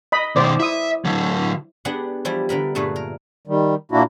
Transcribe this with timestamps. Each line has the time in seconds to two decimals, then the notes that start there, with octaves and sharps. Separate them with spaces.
0.12 D#5 B5
0.36 B2 D#3 C5 D5
0.60 E4 E5 D#6
1.05 D3 F#3
1.85 B3 D4 G4 G#4 F#5
2.25 E3 F3 G3 E4 G4
2.49 D3 B3 A#4 B5
2.75 G2 A#2 A3 G#4 B4
2.96 A#4
3.48 D#3 G3
3.92 A#2 A#3 D4 E4 F#4